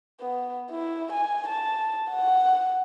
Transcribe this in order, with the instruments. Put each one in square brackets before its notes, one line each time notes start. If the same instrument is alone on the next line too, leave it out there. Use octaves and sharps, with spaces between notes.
[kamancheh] B3
E4
G#5
A5
F#5